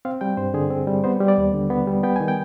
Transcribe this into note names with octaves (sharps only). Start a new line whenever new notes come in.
C4 F5
G3 G5
G2 C5
D3 G#4
C4
G3
B3 C5
G3
D5
D#2
D3
B3
G3
B3 G5
D#3 G#5
G5